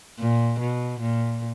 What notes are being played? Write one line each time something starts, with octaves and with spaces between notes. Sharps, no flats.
A#2
B2
A#2